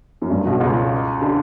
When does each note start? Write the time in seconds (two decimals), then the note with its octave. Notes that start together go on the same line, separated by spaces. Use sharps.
0.22 F#2
0.30 G2
0.45 B1 B2
0.60 C#2 C#3
1.21 D3